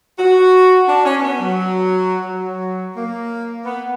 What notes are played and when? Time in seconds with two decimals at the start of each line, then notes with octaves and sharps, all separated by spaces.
0.19 F#4
0.88 D4
1.05 C#4
1.19 C#4
1.22 B3
1.40 F#3
2.26 F#3
2.96 A#3
3.65 B3